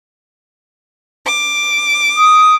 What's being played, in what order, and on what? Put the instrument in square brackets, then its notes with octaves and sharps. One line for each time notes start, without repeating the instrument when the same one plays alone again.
[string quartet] D6
[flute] D#6